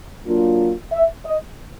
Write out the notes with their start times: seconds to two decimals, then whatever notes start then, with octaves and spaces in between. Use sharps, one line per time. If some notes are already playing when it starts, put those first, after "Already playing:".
0.25 F#3 A#3 D4 F4
0.93 E5
1.26 D#5